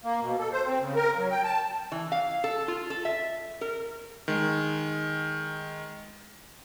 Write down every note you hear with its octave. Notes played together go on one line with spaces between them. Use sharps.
A#3
B2
A4
C5
C4
C#3
A#4
F#3
G5
A5
E3
F5
A4
F4
A4
E5
A#4
D#3 G#3